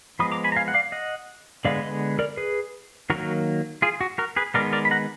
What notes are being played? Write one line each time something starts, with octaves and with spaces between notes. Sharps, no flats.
F3 G#3 B3 B5 D#6
A#5 D6
G#5 B5
A#5
F5 G#5
F#5
D5 F5
D#5 F#5
D3 G#3 B3 D5 F5
B4 D#5
A#4 D5
G#4 B4
D#3 F#3 A#3 F#4 A#4
F4 G#4
F#4
F#4 A#4
G#4 B4
D#3 G#3 B3 A#4 D5
A#4 D5
B5
F#5 A#5